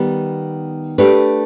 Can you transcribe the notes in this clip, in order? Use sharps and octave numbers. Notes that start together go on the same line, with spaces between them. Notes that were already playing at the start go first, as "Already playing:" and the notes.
Already playing: D#3 G3 B3
A3 D4 G4 B4